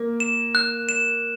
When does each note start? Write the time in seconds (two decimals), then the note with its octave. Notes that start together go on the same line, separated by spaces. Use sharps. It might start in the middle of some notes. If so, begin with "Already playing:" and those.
Already playing: A#3
0.20 E7
0.55 F#6
0.89 E7